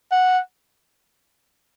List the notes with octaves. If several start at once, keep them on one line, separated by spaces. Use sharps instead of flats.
F#5